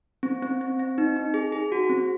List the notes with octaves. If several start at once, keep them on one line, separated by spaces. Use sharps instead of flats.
C4
C4
C4
C4
D#4
D#4
G#4
G#4
F#4
C4